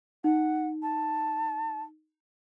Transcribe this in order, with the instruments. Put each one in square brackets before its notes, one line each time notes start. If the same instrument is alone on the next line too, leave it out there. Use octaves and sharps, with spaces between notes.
[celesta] D#4 [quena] F#5
[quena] A5